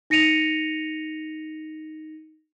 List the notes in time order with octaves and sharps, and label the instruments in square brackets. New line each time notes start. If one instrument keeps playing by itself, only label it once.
[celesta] D#4 A#6 C#7 D#7 F7